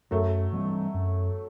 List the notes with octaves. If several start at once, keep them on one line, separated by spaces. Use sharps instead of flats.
F#2 F#3 A3
E3 G3 C4
F#2